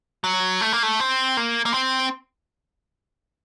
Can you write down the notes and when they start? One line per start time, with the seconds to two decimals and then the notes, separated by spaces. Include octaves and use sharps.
0.24 F#3
0.61 A3
0.73 A#3
0.83 A3
1.00 C4
1.37 A#3
1.66 A#3
1.74 C4